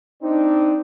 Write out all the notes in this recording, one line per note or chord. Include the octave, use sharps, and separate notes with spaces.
C4 D4 D#4